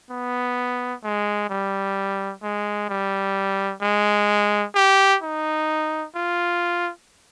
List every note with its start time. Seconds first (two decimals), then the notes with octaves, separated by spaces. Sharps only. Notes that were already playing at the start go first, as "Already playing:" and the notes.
0.11 B3
1.04 G#3
1.50 G3
2.43 G#3
2.89 G3
3.82 G#3
4.75 G4
5.22 D#4
6.15 F4